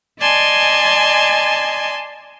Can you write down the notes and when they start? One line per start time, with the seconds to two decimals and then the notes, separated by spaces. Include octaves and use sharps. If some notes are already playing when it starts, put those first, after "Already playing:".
0.21 D5 D#5 G#5 A5 C6 G#6